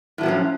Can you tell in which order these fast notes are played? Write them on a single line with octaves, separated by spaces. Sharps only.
A2 F#3 B3 F3 C#4